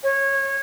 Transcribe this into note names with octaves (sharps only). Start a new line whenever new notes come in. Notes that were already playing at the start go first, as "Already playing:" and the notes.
C#5